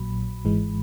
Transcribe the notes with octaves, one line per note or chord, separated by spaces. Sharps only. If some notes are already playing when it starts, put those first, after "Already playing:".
Already playing: A#1 A#2 F#3 B5
G#1 G#2 E3 G#3